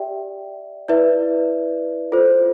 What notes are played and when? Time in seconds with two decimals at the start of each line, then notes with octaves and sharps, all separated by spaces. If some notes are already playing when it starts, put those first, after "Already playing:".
Already playing: G4 D5 E5 G5
0.88 E4 B4 D5 E5
2.12 F4 A4 C5